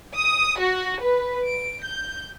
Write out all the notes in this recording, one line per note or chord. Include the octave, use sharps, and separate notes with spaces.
D#6
F#4
B4
D7
G6